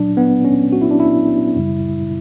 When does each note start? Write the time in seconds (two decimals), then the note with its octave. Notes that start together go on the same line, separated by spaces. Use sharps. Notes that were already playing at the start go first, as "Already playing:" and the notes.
Already playing: A#2 F#3 D4
0.17 B3
0.45 C#4
0.72 F#4
0.81 E4
0.91 D4
1.00 E4
1.56 F#2 C#3 G3